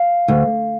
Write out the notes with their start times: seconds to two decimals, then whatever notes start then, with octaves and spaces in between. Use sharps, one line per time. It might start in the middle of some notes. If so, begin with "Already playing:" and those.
Already playing: F5
0.28 D2